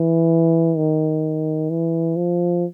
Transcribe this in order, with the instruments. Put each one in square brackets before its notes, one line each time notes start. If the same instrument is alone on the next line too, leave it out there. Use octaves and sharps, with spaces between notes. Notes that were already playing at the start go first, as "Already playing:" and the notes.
Already playing: [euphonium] E3
D#3
E3
F3